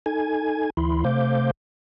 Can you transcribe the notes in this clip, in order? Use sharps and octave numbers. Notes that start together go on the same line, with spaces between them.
D#4 A4 G#5 G#6
D2 E3 E4 B5 C6
C3 A3 C5 F5 D6 G6